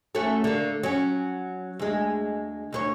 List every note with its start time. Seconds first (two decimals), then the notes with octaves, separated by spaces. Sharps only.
0.15 A3 C#4 F#4
0.44 D3 A#3
0.83 F#3 C#4
1.79 D2 G#3
2.73 D2 D#4 C#5